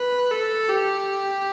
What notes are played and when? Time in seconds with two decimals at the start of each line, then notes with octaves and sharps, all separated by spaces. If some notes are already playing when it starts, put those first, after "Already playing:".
Already playing: B4
0.31 A4
0.68 G4